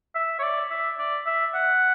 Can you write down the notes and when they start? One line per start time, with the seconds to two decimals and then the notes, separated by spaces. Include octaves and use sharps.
0.15 E5
0.39 C#5
0.43 D5
0.71 E5
0.99 D5
1.26 E5
1.54 F#5